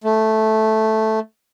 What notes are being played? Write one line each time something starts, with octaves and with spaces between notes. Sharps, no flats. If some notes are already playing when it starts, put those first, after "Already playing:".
A3